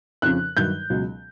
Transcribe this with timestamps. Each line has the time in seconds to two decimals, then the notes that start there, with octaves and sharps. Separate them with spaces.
0.22 F2 C#3 F3 F#6
0.57 G2 D#3 F#3 G6
0.90 C#2 B2 F#3